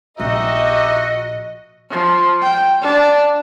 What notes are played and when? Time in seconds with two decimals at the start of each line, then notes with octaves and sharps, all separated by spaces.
0.20 A#1 D#4 F#4 G4 D#5 E5
1.91 F3
2.41 G5
2.82 D4